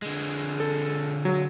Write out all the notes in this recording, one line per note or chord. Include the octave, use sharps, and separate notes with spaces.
D3 G#3
A4
F#3